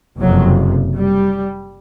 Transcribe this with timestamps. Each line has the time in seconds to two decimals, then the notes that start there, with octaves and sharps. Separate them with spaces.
0.19 F#1 F2 C3 F#3
0.95 G3